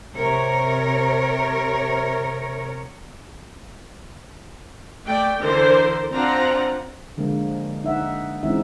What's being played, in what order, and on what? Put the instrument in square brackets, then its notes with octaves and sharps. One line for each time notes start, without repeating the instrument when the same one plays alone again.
[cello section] C3 A#4 C#5
[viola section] A3 D5 G5
D3 E3 A#4 C5
C4 D4 F4 C5 F#5 A#5
[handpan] D3 F3 G#3 A#3
D#4 E5 F#5
E3 G#3 C4 C#4 D#4 E5